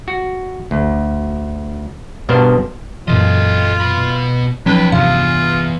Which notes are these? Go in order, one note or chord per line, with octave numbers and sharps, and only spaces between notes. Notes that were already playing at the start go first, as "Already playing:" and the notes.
F#4
D2
G2 B2 B3 D4 A#4 C5
F#2 A#2 E3 F4 A4 D#5
B2 B5
E2 F3 F#3 C#4 D#4 B4 G5
E2 G2 C3 F4 F5